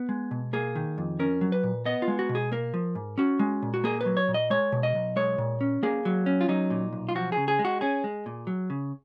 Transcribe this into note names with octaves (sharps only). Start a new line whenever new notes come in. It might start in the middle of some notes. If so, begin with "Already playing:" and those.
Already playing: B3
G#3
B2
A#3 G#4
D#3
F2
C#4 A#4
F#3
B4
A#2
B3 D#5
F4
G#3
F#4
B2
G#4
A#3 A#4
F3
G#2
C#4 F#4
G#3
A#2
F#4
A#3 G#4
B4
F#3
C#5
A#2
D#5
G#3 C#5
B2
D#5
B1
G#3 C#5
A#2
C#4
A#3 G#4
F#3
C#4
F4
F#3 D#4
A#2
B1
F4
F3 F#4
C#3 G#4
G#4
G#3
F#4
C#4 G#4
G#3
A#2
F#3
C#3